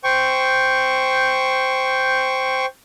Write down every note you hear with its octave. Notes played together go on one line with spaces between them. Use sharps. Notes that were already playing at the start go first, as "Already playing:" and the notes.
C5 G5 C#6